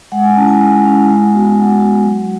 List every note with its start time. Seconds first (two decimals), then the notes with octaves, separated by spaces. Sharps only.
0.12 G#3 F#5
0.24 G#5
0.36 C#4 E4 A5
0.48 G#5
0.61 G#3
0.84 C#4 E4
1.09 G#3
1.33 B3 F#4
1.56 G#3 F#5
1.80 B3 F#4
2.04 F#3